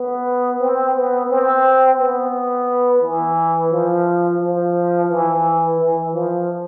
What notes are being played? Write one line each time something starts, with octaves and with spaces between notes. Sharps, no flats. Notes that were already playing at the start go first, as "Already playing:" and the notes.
Already playing: B3
C4
B3
C4
B3
E3
F3
F3
E3
E3
F3